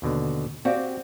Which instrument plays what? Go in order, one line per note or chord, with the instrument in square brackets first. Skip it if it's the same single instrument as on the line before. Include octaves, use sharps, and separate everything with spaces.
[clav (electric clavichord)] D#2 B2 D3
[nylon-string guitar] C4 [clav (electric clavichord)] F#4 G4 [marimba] C5 D5 F5